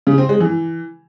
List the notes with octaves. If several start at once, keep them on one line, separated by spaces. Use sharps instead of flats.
C#3
C4
G#3
E3